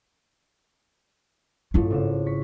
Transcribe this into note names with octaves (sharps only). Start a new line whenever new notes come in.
A1 G2 A3 E4 F4
G#1 C#3 E7
C#6 B6